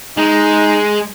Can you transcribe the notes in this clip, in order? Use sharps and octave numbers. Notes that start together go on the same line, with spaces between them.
G#3 D#4